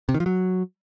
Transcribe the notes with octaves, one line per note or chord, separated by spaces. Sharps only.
C3
D#3
F3
F#3